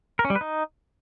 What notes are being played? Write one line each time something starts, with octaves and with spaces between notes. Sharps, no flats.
A#4
C#4
G3
B4
D#4